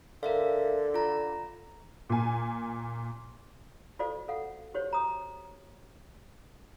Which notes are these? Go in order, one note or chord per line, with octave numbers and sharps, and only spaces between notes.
D3 A#4 E5 F5
F4 A#5
A#2 G#5
F4 F#4 A4 C5 D5 F5
A4 F5 F#5
F#4 G4 C5 C#5
A#5 D#6